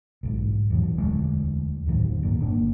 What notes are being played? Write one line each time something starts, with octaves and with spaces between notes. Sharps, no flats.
B1 G#2
E2 B2 F#3
E1 D2 F#3 G#3
D2 A2 D#3 F#3
F#1 G2 A#2 A#3
G1 A#3 D4